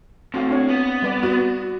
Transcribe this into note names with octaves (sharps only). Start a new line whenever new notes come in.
A2 C4 F#4 F5
C4 D4 C#5
B3
G3 B4 D5
F#4